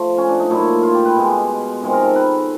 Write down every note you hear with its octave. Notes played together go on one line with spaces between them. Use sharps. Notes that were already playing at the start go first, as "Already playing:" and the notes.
Already playing: F3 A3
C#4
D4
D#4
A#2 F#3 A3 E4
F4
G4
B4
B2 G#3
C3 D#3 G#3
A#4
A4
B4